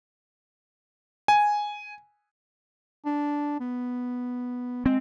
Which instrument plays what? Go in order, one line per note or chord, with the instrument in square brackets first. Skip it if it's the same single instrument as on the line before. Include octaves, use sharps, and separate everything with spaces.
[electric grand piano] G#5
[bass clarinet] D4
B3
[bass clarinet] G#3 [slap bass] C4